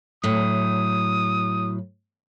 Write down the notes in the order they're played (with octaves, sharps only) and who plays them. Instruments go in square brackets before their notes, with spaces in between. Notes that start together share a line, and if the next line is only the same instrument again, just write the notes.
[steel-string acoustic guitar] A2 F#3 [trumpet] D#6